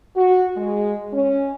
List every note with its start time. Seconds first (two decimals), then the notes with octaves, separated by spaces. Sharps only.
0.16 F#4
0.56 G#3
1.13 C#4